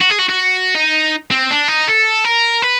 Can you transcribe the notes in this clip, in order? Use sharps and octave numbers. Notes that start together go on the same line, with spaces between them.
F#4
G#4
F#4
F#4
D#4
C4
D4
D#4
A4
A#4
B4